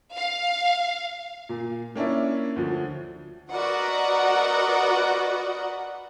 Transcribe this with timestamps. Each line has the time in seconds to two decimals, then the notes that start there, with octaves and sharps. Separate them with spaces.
0.14 F5
1.49 A#2
1.95 A#3 C#4 D4 E4
2.56 D2 F3
3.51 F#4 A#4 B4 D5 D#5 F#5